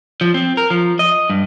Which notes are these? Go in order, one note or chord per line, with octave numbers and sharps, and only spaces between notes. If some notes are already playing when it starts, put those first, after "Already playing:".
F3
C4
A#4
F3
D#5
G2